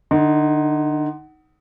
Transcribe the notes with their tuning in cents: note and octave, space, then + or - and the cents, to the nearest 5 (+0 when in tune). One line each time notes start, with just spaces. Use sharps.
D3 +30 D#4 +10